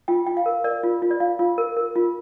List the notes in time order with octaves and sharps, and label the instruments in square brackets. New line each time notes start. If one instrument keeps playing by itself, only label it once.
[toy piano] F4 G5
F4 G5
F5
A#4
A#4 D5
F4
F4
D5
F4 F5
F4
A#4
A#4
F4